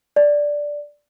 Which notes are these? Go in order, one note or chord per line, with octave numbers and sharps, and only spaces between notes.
D5